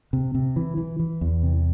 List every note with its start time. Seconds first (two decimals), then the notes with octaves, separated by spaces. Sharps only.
0.13 C3
0.35 C3
0.56 E3
0.77 E3
1.00 E3
1.21 E2
1.43 C3